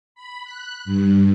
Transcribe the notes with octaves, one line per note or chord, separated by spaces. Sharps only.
B5
F#6
G2